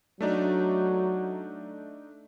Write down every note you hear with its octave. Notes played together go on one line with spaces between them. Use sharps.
F#3 A3 D4 D#4